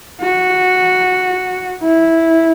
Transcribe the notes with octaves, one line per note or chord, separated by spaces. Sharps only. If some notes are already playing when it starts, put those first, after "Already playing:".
F#4
E4